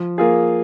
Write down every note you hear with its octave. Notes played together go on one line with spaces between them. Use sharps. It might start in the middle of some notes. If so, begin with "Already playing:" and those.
Already playing: F3
A#3 F4 G#4